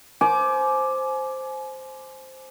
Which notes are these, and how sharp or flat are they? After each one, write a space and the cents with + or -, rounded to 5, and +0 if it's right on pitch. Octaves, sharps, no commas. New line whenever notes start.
C5 +0 G#5 +35 D6 +0